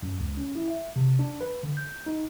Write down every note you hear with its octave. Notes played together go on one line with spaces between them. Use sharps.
F#2
C#2
C#4
E4
E5
C3
D4
B4
D3
G6
D#4